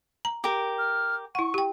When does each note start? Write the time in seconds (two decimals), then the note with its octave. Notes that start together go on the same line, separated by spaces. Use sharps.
0.25 A#5
0.44 G4 A#4
0.78 F6
1.35 E4 F#5 C#6
1.54 G4 G5